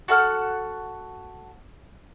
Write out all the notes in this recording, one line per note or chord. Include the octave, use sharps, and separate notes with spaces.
F#4 A4 F#5 F6